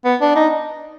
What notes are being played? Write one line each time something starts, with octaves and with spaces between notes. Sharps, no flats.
B3
D4
D#4